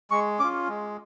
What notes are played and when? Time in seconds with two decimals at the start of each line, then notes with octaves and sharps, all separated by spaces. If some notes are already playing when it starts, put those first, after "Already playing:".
0.11 G#3 C#6
0.39 C#4 F4 D6
0.68 G#3